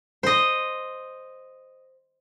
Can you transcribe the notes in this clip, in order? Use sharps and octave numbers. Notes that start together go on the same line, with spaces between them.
C5 D#5